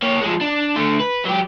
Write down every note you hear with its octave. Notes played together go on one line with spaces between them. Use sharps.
A#3 C#5
F3 G#3
D4
D3 A3
B4
F#3 G4